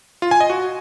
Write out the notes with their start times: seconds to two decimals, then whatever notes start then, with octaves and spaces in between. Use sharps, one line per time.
0.22 F4
0.31 G#5
0.41 D#5
0.50 F#4